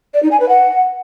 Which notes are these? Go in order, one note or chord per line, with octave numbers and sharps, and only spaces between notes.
D5
D#4
G#5
B4
F#5